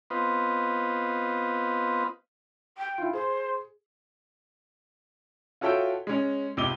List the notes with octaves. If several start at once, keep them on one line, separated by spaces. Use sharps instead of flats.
B3 C4 F4 B4 D#5
G5
E4 F4
G#4 C5
F4 F#4 A4 C#5 E5 G5
G#3 C#4
C#2 C3 D6 D#7 G7